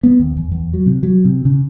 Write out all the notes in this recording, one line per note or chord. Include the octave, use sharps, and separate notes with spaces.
B3
D#2
E2
E2
F#3
C3
F#3
C3
C#3